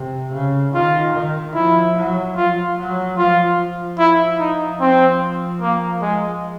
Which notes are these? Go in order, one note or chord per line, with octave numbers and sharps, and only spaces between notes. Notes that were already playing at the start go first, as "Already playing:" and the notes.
Already playing: C3
C#3
D#3 F4
D#3
F3 E4
F#3
F3 F4
F#3
F3 F4
E4
D#4
C4
A#3
G#3